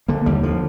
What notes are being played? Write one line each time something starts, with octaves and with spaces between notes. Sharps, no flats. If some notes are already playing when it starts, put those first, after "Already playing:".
D3 A#3
D#2 G3
D3 F3